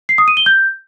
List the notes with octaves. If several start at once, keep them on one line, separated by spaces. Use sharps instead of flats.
C7
D#6
D#7
G7
G6